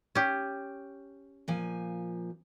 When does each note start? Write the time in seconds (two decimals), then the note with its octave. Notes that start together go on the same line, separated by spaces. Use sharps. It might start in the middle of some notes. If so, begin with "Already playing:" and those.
0.15 C#4 G4
1.48 A#2 F3 G#5